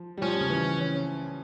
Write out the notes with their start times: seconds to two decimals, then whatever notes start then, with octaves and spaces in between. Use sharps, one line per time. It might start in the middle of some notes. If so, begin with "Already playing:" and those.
Already playing: F3
0.17 G3
0.22 F3 C#4
0.41 C#3
0.50 E3